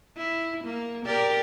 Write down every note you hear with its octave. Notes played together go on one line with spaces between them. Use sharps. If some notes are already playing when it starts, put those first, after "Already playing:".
E4
A#3
G4 A#4 D5